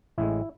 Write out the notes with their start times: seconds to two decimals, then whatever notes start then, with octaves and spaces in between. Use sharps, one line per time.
0.18 A1 A2 G#3 E4